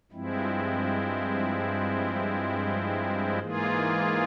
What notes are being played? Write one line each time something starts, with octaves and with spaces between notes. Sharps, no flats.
G2 F3 G#3 C4 E4
G#2 E3 A#3 F4 G#4